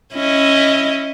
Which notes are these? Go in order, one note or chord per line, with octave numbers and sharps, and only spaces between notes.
C#4 E4 D#5